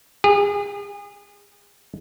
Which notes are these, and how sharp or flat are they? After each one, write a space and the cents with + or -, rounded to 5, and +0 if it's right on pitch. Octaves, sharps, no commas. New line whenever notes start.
G#4 -35